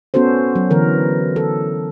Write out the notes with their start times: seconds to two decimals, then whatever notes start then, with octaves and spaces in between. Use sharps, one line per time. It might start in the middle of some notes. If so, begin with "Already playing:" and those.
0.14 B3 C#4 F#4 A4 C5
0.56 F#3
0.71 D3 E3 A#4
1.36 A4